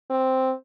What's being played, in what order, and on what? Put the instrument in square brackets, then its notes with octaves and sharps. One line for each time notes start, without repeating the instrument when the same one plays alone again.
[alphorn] C4